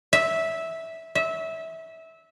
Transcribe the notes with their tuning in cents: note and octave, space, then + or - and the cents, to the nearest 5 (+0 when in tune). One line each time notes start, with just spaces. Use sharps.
E5 -10
E5 -20